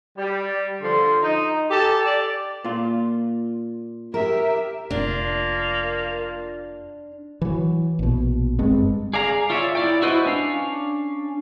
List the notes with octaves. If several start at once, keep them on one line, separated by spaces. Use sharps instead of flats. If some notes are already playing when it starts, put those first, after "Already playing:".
G3
D3 F3 C6
D#4
G4 A4 G#5 A5
D5
A#2 F4
G4 A#4 E5
F1 A#3 D4 F4
E3 F#3
A#1 B2
F#1 G2 G#3 C4
G#4 D5 F5 A#5
F4 C#5 D5 E5
E4 D5 G5
E4 F#4 B4 C5 D#5
C#4 D4 F5